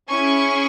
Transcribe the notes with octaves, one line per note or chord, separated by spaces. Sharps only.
C#4 E4 G#4 G#5 C#6